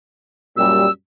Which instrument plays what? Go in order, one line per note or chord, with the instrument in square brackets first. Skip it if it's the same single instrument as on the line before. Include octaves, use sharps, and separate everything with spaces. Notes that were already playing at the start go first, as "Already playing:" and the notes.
[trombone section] F#2 A#2 G3 [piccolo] E6